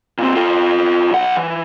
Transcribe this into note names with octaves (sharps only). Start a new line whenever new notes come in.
A#2 C4
F4 A4
B1 F#5
E3